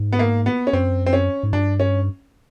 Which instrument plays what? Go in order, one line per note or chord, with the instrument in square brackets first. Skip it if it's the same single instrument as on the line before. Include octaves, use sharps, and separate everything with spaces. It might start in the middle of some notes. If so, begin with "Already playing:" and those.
Already playing: [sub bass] G#2
[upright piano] B3
A#3
B3
C#4
[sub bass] F#2 [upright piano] C4
[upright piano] C4
C#4
[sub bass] G#2
[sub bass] G2 [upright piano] D4
[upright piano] C#4